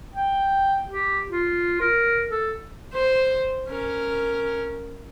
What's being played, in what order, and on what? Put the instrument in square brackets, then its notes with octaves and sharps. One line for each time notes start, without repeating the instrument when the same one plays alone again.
[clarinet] G5
G4
F4
A#4
A4
[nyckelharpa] C5
C#4 A#4